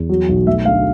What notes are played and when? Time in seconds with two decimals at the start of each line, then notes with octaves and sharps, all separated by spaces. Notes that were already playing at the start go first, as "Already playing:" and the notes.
Already playing: E2
0.09 F#3
0.29 B1
0.47 A3 E5
0.65 D2 F5